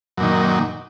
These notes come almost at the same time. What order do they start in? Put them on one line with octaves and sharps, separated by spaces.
F#2 A#2 D#3